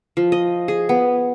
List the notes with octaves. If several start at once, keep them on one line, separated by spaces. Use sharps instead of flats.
F3
D#5
G#4
B3